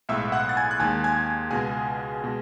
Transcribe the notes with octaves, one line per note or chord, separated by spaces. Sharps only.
B1 A2 G#3 E5 E6
F#5 F#6
A6
G#5 G#6
F#6
D#2 D#3 G#3 G#5 G#6
G#5 G#6
C#2 B2 G#3 G#4 G#5
B2 G#3